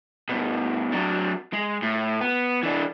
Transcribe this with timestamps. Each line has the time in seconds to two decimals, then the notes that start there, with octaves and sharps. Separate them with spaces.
0.29 G2 B2
0.92 F#3 D4
1.53 G#3
1.82 A2
2.21 B3
2.63 E3 D4